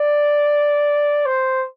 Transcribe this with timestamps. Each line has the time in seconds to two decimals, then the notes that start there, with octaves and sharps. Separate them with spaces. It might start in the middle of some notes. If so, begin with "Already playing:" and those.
Already playing: D5
1.26 C5